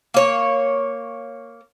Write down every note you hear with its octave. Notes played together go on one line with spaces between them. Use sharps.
A#3 C#5